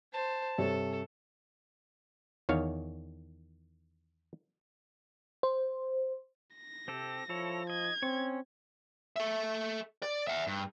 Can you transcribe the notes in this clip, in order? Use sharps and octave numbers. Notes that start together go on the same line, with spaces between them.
C5 A5
G2 C3 A4 C#5
E2 D#3 C#5 F5
C5
A#6
C3 C4 G4 A4
F3 E4 A4 C#5
D#5 G#6
C4 C#4 C#5
A4 E5
D5
E5 F#5
G2